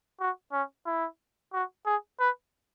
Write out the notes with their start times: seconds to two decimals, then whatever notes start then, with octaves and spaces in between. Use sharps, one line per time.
0.20 F#4
0.53 C#4
0.86 E4
1.53 F#4
1.86 G#4
2.20 B4